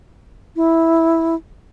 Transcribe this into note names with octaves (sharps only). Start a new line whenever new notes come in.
E4